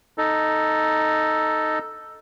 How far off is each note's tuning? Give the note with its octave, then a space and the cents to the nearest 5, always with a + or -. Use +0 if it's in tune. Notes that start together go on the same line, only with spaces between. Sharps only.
D#4 +0 A4 +0